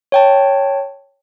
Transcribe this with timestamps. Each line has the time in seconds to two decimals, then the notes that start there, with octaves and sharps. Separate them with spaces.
0.12 C#5 G5 A5